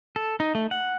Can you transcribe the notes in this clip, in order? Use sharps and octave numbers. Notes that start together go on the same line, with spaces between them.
A4
D#4
A3
F#5